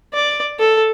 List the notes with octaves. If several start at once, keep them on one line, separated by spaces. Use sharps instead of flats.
D5
A4